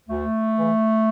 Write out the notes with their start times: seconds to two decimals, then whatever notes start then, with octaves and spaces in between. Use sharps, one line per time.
0.09 D2 A3
0.55 C#3 E3